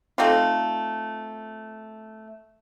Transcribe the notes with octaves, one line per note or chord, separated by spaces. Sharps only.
A3 C4 D#4 F4